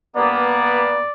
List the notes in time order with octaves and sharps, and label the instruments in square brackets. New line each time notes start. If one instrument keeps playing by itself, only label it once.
[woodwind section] G2 A#3 B3 [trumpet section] D5